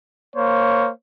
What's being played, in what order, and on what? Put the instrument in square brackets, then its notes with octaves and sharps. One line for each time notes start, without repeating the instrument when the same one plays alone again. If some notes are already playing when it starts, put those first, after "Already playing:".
[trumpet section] A#3 C5 C#5